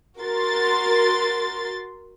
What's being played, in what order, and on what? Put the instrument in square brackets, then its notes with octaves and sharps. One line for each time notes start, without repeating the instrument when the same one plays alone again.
[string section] F#4 A#4 C6 A6